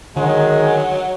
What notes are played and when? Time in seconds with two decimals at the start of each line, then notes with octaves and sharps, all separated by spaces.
0.16 D3 D#3 F#3 G#3